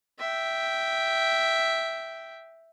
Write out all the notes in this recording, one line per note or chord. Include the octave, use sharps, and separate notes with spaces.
E5 G5